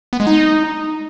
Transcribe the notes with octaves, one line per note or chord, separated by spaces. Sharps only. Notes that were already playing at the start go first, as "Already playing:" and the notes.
B3
G#3
D#4